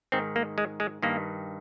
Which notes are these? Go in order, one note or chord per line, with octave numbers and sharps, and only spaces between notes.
G#2 D#3 C4
A#3
G#3
G#3
G2 D#3 A#3